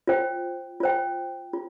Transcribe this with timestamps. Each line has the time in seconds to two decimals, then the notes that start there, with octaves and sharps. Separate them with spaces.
0.07 F4 C5 G5
0.80 F4 C5 G5
1.53 F4